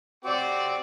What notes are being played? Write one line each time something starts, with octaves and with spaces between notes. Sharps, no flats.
C4 F#4 G4 D5